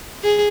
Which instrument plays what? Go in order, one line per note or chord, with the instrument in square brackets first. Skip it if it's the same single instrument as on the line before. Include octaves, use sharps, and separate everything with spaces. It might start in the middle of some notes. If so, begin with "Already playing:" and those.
[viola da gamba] G#4